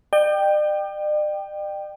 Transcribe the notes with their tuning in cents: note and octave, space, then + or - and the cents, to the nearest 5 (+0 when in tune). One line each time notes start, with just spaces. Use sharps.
D5 +45 G5 +0